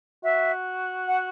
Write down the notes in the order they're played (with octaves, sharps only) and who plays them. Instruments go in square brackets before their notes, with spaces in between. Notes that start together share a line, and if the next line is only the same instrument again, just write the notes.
[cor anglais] F#4 [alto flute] E5
[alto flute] F#5